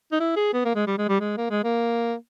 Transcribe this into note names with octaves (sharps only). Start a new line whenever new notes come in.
D#4
E4
G#4
B3
A#3
G#3
G3
G#3
G3
G#3
A#3
G#3
A#3